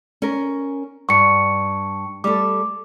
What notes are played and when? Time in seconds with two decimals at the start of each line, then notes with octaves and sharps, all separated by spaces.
0.22 C#4 A#4
1.09 G2 C#6 C#7
2.24 G3 A3 A4 D6